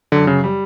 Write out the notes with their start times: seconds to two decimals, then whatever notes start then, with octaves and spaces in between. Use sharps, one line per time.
0.12 F#2 D3
0.27 C#3
0.44 G3